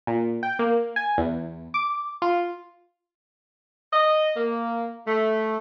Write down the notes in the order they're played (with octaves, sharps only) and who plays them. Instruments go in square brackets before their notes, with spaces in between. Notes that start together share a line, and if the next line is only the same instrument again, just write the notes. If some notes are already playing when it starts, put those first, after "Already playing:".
[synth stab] A#2
G5
A#3
G#5
E2
D6
F4
[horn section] D#5
A#3
A3